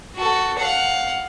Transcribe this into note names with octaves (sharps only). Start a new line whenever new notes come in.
F#4 A4
F5 F#5